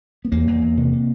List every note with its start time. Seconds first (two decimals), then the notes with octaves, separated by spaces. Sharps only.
0.25 B3
0.32 E2 A#3
0.47 E2
0.62 E2
0.77 C3
0.93 C3